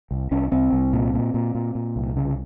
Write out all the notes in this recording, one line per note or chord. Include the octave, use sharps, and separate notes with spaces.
C2
C2 C#4
C2 C4
C2
A#2
A#2
A#2
A#2
A#2
C2
C#3